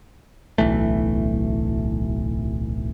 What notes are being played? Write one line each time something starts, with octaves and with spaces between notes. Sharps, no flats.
D1 B1 E3 A3